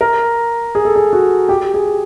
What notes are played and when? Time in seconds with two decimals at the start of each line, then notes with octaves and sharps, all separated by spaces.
0.01 A#4
0.75 G#4
0.85 A4
0.96 G#4
1.13 F#4
1.49 G4
1.74 G#4